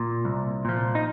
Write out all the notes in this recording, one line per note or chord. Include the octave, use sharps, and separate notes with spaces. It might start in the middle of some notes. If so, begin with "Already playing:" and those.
Already playing: A#2
C2
A#2 F3
D#4